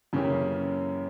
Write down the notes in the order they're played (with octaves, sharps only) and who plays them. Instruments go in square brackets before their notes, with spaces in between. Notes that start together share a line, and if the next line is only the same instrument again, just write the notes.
[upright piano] F#2 E3 A#3 C#4 G4 [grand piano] C#3